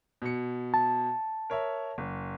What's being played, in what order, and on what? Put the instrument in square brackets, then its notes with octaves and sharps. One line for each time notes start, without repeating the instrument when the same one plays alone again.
[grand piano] B2 C#7
[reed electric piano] A5
[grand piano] A#4 C#5 E5
F#1